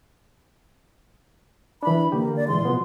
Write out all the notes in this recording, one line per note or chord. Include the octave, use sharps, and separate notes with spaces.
E3 D4 B5
D3 A#3 G4
D5
A#2 E3 G#3 C6
B2 F3 B3